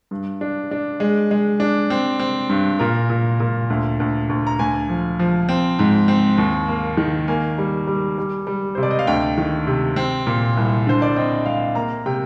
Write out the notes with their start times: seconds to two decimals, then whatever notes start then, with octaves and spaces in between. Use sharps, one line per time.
0.11 G2
0.41 D4
0.71 D4
1.00 G#3
1.31 G#3
1.60 D4
1.90 C4
2.20 C4
2.50 G2
2.79 A#2 A#4
3.10 A#2
3.40 A#2
3.70 D2
4.00 D2
4.29 D2
4.47 A#5
4.59 D2 G#5
4.89 F3
5.19 F3
5.49 C4
5.79 G#2
6.08 C4
6.38 D#2
6.68 A#3
6.97 D#3
7.28 A#3 G#5
7.58 G3
7.87 G3
8.18 G3
8.47 G3
8.75 C3 C5
8.83 D5
8.91 D#5
8.99 F5
9.07 D2 G5
9.38 D#3
9.67 C3
9.96 C4
10.27 A#2
10.57 C2
10.87 D3 C5
11.02 D5
11.16 C4 D#5
11.46 C4 F5
11.75 A#3 A#5
12.06 C3 G5